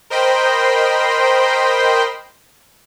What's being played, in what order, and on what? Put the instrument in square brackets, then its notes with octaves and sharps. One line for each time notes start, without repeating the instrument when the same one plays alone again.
[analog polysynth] A#4 C5 D#5 G5 B5 C6